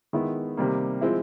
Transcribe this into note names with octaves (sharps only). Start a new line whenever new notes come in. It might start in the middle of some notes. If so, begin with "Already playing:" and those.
D#3 G#3 B3 E4
C3 D#3 G3 A#3
F3 G#3 C4 E4